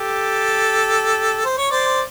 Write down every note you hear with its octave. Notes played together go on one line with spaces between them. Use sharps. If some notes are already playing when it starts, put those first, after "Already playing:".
Already playing: G4 A4
C5
C#5
C5 D5